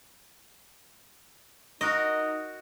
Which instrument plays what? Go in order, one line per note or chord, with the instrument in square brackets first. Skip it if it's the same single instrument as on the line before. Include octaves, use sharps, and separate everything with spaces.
[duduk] D#4 [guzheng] F#4 A#4 D#5